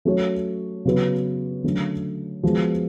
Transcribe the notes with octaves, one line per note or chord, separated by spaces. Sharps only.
F#3 A3 C#4 F#4 C#5
C#3 F#3 B3 F#4 B4
D3 F#3 A3 C#4
F3 G#3 B3 F#4